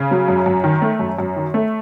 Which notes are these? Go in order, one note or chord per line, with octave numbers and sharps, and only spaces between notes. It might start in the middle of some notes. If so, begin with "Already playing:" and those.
Already playing: C#3
F#3
F#2
F#2
D#3
A3
F#2
F#2
D#3
A3